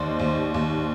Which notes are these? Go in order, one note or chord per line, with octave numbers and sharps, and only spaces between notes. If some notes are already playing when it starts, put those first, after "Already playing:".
Already playing: D#2 C5 D5 D#5
D#2
D#2